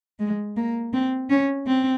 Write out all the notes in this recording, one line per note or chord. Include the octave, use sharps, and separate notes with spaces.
G#3
A#3
C4
C#4
C4